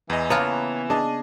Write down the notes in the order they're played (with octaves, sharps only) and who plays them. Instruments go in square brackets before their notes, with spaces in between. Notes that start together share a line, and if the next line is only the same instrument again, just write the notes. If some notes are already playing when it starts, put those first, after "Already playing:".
[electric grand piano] E2 D#5 [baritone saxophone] E3
[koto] C#3 A#3 F4 [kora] B3 [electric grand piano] C#5 A5 A#5
[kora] D4 [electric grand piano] G#4 D#5 A5